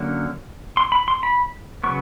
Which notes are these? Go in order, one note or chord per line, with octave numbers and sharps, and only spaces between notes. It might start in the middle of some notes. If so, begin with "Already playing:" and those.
Already playing: D3 F#3 A#3 C#4
C6
B5
C6
B5
C#3 F#3 B3 C#6